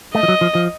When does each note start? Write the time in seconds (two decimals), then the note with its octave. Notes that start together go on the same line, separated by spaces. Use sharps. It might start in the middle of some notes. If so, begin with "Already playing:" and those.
0.15 A3 D#5
0.23 F3
0.28 F#3
0.41 F3
0.55 F3